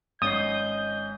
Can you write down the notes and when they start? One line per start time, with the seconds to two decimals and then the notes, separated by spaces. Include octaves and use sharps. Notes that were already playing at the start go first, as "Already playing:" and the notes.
0.22 G#1 C#4 D#5 D#6 G6 C7